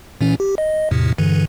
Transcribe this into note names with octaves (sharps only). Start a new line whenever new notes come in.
A#2 E3 C#4
G4
D#5
E2 A2 C3
G2 D3 E3